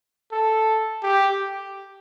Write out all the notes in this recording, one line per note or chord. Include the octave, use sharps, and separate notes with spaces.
A4
G4